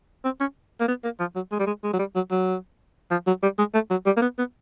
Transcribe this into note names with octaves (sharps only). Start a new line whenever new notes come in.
C4
C#4
A#3
B3
A#3
F3
F#3
G#3
G3
G#3
G#3
F#3
G3
F#3
F#3
F3
F#3
G3
G#3
A3
F#3
G3
A#3
B3
B3